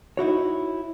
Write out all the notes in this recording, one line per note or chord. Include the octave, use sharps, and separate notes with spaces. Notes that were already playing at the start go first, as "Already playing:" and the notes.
D#4 E4 F#4 C#5